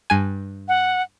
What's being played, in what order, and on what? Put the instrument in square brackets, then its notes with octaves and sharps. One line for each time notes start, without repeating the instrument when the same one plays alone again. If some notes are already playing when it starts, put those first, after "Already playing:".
[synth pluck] G2 G#5
[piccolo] F#5